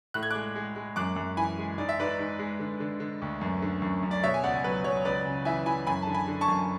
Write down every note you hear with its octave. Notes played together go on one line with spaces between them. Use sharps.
A2 F#6
G#6
G#3 D6 F#6
G#3
G#3
F#2 D6 F#6
F#2
E3 G#5 B5
G#3
G#2 D5
E5
G#2 B4 D5
G#2
G#3
D3
D3
D3
D2
F#2
D3
F#2
F#2
D5
B2 C#5 E5
G#5
C#2 D5 F#5
F#3 B4
F#3 C#5
C#2 B4 D5
C#3
E3 E5 G#5
E3 G#5 B5
F#2 G#5 B5
D3 A5
G#5 B5
D3
A5 C#6
F#2